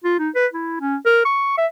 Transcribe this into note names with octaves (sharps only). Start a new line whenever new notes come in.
F4
D#4
B4
E4
C#4
A#4
C#6
E5